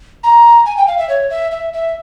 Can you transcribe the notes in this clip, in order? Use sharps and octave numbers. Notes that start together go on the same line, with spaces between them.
A#5
G#5
G5
F5
E5
C#5
E5
E5
E5